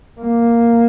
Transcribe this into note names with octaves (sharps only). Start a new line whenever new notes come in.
A#3